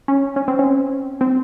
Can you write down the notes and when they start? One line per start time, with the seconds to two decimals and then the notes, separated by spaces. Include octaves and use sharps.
0.08 C#4
0.36 C#4
0.48 C4
0.59 C#4
1.21 C4